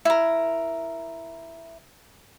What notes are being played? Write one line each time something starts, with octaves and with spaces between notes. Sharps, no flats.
E4 A#4